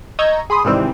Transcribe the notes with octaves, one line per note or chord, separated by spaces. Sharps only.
D#5 A#5 C#6 E6 G6 G#6
G#4 B5 C6 D#6
G#2 C3 D#3 E3 G3 C4